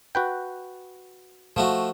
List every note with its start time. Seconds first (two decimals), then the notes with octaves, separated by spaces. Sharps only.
0.15 F#4 B4 G5
1.56 F3 A3 F#4